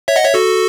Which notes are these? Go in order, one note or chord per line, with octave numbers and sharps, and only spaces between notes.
C#5 E5
D#5 F#5
C#5 E5
F#4 A4